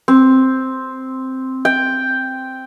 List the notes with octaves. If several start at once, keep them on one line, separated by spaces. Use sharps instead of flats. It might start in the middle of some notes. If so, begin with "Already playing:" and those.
C4
G5